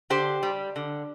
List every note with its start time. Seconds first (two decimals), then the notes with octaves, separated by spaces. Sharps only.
0.10 D3 G4 C5
0.43 G3
0.76 D3